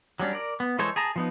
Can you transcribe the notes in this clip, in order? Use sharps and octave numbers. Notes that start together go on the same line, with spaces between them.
F#3 G3 C#4 D4
A#4 D5
B3
E3 G#3 A4 C5 C#5
G#4 A5 A#5
F3 B3 D#4